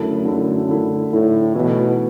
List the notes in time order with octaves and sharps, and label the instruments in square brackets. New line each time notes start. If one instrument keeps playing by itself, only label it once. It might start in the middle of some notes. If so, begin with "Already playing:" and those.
Already playing: [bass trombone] F#2 [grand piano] D3 A3 E4 A4
[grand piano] D3 A3 E4 A4
D3 A3 E4 A4
[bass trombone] A2 [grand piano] D3 A3 E4 A4
[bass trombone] B2 [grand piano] E3 A3 E4 B4